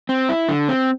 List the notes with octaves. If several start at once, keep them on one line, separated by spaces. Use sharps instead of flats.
C4
E4
D3
C4